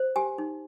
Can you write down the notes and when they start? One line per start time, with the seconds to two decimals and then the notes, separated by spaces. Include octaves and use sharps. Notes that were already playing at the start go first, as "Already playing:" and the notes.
Already playing: C5
0.16 G4 G#5
0.38 D#4